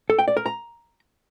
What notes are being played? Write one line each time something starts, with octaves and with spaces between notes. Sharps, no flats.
A4
G5
D5
A#4
A#5